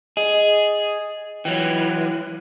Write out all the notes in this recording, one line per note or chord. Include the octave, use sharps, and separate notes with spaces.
G#4 D#5
E3 F#3 G5